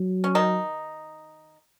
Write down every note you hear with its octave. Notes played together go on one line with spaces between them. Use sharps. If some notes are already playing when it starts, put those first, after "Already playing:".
Already playing: F#3
C#4
D#3 D#4